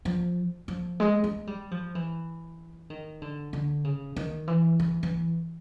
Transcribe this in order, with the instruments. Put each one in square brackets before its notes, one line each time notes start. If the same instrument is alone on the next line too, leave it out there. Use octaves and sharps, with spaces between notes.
[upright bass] F3
F3
G#3
G#3
G3
F3
E3
D#3
D3
D3
C#3
D#3
E3
E3
E3